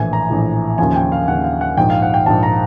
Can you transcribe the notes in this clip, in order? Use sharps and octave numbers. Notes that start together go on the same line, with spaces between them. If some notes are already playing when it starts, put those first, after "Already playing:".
Already playing: A#1 A2 E3 G#5
A#5
A#1 A2 E3
D#2 C#3 F3 G#5
G5
F5
D#2 C#3 F3 F#5
F5
F#5
A#1 G#2 F3 G5
F5
F#5
G5
A#1 G#2 F3 A5
A#5